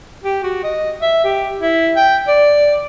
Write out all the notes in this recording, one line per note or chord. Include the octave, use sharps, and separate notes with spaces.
G4
F#4
D#5
E5
G4
E4
G5
D5